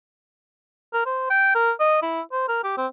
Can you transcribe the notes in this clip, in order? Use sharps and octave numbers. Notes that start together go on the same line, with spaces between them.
A#4
C5
G5
A#4
D#5
E4
C5
A#4
G4
C4